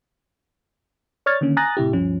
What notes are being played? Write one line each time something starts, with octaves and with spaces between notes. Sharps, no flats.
C#5 D5 C#6 F6 G#6 A6
D3 D#3 A#3 C#4
G#5 A#5 D#6 F#6 A6 A#6
A2 C3 E4 G4
D2 G2 F3 C#4